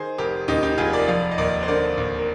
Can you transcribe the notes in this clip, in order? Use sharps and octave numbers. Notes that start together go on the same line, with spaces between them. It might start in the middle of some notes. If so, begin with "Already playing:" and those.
Already playing: D#3 G#4 C5
F1 G4 A#4
D#2 D#4 G4
D#4 G4
F1 F4 G#4
A#4 D5
F3 D5 F5
D#5
D#2 A#4 D5
C5
D3 A#4 D5
D#2
A#4